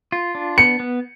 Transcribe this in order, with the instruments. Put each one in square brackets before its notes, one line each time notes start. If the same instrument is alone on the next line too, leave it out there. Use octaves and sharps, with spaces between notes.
[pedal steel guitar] F4
D4
[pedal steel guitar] B3 [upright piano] C#7
[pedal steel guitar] B3